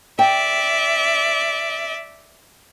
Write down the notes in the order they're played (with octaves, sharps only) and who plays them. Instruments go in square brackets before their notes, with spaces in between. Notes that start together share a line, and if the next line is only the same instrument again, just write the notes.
[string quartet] D5 E5 [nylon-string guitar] G5